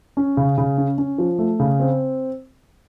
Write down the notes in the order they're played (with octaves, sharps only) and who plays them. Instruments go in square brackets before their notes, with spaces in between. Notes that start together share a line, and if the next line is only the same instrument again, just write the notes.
[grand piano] C#4
C#3
C#3
C#4
C#4
F3
A3
C#3
C4